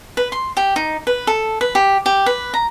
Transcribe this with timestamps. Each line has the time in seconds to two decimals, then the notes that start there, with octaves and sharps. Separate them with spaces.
0.17 B4
0.32 C6
0.57 G4
0.76 D#4
1.07 B4
1.27 A4
1.61 B4
1.75 G4
2.06 G4
2.26 B4
2.54 A#5